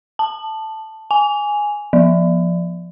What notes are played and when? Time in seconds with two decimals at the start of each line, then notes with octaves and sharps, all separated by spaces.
0.19 A5
1.11 G#5
1.93 F3